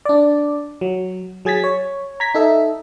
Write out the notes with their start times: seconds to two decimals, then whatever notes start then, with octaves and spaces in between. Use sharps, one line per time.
0.05 D4 D5
0.81 F#3
1.45 F#3 G#4 G#6 A6 B6
1.64 C#5
2.20 A#5 G#6 B6
2.34 D#4 A4 E5